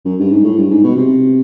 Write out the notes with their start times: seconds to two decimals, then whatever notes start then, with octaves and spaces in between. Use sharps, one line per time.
0.05 F#2
0.19 G2
0.31 G#2
0.44 A2
0.57 G2
0.70 G#2
0.83 B2
0.96 C3